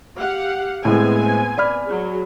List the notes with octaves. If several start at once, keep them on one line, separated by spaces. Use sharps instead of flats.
G4 F5 F#5
A2 G#3 B3 C4 G#5
D5 B5 F6
F#3 G#4